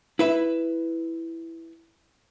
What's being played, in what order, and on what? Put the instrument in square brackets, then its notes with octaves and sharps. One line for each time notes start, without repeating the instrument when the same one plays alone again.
[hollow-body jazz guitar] E4 B4 E5